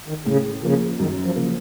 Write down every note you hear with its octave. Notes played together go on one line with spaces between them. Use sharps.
D#3
A2 C#3
C#3 F3 A#3
F#2 D#3
F3
C#3 F3 A#3